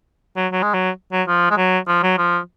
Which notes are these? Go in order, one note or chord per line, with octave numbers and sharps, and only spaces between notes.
F#3
F#3
G#3
F#3
F#3
F3
G#3
F#3
F3
F#3
F3